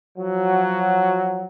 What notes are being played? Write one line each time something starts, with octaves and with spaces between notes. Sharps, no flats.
F3 F#3